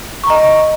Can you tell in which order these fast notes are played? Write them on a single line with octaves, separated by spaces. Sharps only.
C#6 A#5 D#5